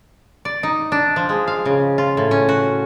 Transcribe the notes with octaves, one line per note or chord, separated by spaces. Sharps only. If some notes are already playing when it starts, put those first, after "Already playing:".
D5
D#4
D4
F3
G#3
F5
C#3
F4
A2
C#4
F#4